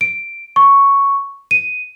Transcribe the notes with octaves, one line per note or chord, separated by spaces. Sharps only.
D7
C#6
D#7